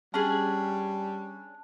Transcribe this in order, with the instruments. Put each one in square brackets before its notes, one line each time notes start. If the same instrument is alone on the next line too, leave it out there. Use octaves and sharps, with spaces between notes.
[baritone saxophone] G3 [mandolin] C#4 D4 G#4 [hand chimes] A5